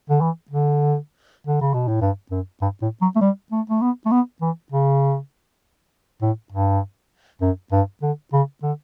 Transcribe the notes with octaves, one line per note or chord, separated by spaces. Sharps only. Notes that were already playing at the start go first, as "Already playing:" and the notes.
D3
E3
D3
D3
C#3
B2
A2
G2
F#2
G2
A2
F#3
A3
G3
A3
A3
B3
A3
B3
E3
C#3
A2
G2
F#2
G2
D3
C#3
D3